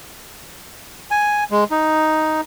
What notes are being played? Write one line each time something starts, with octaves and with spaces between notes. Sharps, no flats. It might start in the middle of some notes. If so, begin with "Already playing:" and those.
G#5
G#3
D#4